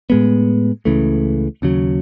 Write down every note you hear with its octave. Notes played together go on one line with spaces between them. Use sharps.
A2 G#3 B3
C#2 C#3 E3 A3
D#2 C#3 F#3